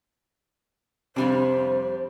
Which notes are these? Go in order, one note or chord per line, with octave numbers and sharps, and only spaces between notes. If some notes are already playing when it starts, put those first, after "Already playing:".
F2 C3 G3 D4 C5